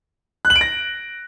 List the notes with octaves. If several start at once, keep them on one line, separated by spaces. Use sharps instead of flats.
F#6
F#7
D7
A#6